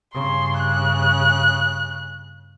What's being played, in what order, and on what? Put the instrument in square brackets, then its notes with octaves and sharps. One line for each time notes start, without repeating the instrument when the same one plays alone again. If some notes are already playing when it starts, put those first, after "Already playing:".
[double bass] G2 C#3 [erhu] C6
[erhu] F#6